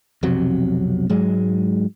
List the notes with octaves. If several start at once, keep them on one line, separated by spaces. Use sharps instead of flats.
B1 F2 C3 F#3
G#2 F#3 G#3